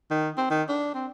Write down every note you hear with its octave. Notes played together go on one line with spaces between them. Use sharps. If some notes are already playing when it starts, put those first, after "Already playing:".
D#3
C4
D#3
D4
C4